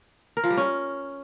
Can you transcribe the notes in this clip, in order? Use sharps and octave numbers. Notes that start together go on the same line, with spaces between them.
A#4
F3
G3
C#4